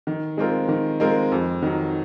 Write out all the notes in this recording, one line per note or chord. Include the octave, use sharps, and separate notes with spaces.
D#3
G#3 C4 F4 A#4
D#3
G#3 C4 F4 A#4
F2
D#3 F#3